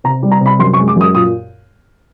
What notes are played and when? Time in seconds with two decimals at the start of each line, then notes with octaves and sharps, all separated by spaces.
0.04 C3 A#5
0.23 G3
0.32 A#5
0.41 C3
0.46 B5
0.59 F#2 C6
0.73 C#6
0.79 G#3
0.88 D6
0.96 F#2 D#6
1.14 A#2 D#6